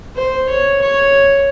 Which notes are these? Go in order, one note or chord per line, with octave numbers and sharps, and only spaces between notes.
C5
C#5
C#5